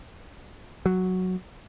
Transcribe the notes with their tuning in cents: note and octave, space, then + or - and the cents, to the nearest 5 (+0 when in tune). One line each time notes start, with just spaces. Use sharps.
F#3 +0